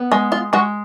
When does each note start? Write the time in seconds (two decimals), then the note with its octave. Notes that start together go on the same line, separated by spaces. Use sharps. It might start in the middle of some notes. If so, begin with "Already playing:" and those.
Already playing: B3
0.12 G#3
0.32 F4
0.53 G#3 F#4